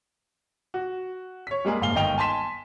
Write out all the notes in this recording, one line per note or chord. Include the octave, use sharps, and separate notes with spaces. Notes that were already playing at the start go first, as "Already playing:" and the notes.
F#4
C#5 B6
G3 G#3 A#3 G#4
F#1 G#2 F5 G7
G1 D#3 D#5 G5 F7 G7
G#5 A5 C6 B6 E7